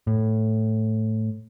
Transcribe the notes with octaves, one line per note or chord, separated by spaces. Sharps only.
A2